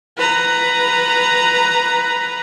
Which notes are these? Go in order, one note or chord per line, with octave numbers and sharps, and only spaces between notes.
B4 A#5